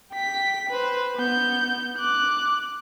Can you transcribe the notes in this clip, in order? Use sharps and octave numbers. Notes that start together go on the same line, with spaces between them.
G5 B6
B4 C5
B3 G6
D6 F#6